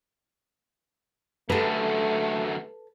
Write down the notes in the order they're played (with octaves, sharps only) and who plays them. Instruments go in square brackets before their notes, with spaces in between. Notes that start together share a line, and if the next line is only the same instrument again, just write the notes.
[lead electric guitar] F#2 D3 [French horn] A3 [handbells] G4 [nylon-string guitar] A4 B4